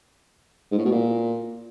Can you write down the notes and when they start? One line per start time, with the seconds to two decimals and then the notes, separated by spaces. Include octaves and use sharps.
0.72 G#2
0.79 A2
0.85 B2
0.92 A#2